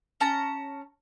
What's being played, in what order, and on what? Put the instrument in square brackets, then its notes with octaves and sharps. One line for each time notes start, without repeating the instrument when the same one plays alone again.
[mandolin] C#4 A5 A#5